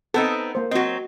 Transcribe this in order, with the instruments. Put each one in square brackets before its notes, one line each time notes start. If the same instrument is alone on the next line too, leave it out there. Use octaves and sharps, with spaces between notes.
[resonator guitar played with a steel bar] B3 C4 D#4 [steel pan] A4
[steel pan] A#3 C5
[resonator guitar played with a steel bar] F#3 C4 [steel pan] F#4 D#5